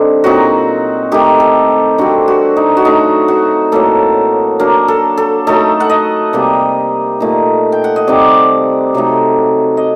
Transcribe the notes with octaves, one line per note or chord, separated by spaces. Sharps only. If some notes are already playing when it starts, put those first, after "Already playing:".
Already playing: D3 G3 C4 D#4
A#2 F#3 C4 D#4 F#4
D#3 A3 D#4 G4
A4
D3 G3 C4 F#4
F#4
D#4
F#4
F#3 A3 D4 D#4
F#4
A2 F#3 A#3 A4
F#3 A#3 D4 A#4
A4
A4
F#3 A3 D#4 A4
F#5
D#5
C3 G3 A#3
A#2 A3 D#4
G5
F#5
D#5
C3 G3 C4 D#4 D5
C3 F#3 A3 D#4
D#5